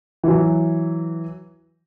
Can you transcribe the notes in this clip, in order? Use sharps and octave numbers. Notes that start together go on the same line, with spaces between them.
E3 F#3